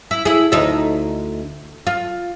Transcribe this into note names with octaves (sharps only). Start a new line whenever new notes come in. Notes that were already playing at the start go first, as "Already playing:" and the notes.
E4
E4 G#4
D2 D#4 E5
F4